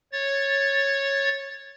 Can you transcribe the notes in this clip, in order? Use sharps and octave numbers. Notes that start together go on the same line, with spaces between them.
C#5 A6